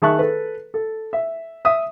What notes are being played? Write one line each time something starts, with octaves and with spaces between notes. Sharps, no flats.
D#3 G#4 E5 A5 C#6 F#6
A4 B4
A4
E5
E5 D#6